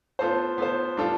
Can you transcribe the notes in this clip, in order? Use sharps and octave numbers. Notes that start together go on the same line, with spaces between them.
B3 F4 A4 C5
B3 F4 A4 C5
G3 D4 F4 A4